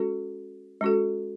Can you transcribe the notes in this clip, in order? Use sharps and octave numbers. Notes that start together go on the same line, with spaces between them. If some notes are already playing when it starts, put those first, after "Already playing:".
Already playing: G#3 C#4 F#4 A4
G#3 C#4 F#4 A4